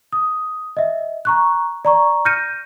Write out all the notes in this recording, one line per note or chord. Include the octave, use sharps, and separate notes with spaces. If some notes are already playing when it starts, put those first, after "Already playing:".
D#6
D#5 E5
A#5 C#6 F#6
D5 A#5 C#6
F6 G6 A#6 C#7 D#7